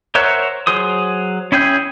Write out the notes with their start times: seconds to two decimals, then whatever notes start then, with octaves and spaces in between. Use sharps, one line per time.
0.15 A#4 C5 C#5 E5 F#5
0.67 F#3 G#4 C5 D#6
1.52 C#4 E4 G#4 G5 G6